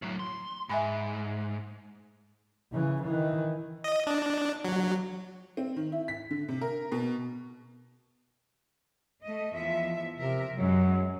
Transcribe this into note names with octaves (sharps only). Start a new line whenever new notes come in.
A2 F#3
C6
G#2 E5 G#5 B5
C#3 E3
D#3 E3
D#5
D4
F#3
C4
D#3
E4
B6
D3
C3
A#4
B2
A3 D#5
E2 F3 E5
C3 A#4 E5
F#2 F#3 G#3